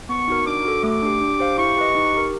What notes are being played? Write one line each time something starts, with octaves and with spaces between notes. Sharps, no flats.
B3 C#6
D#4 F#4 A#4
D4 D6
F#4 A4
A3 D6
D4 G4
D4
G4 C5 F5
E4 C#6
G4 B4 D#5
D#4
G4 A#4